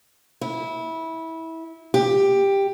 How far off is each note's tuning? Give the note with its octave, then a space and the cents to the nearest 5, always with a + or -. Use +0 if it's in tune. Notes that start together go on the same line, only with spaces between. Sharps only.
E4 -20
G4 +10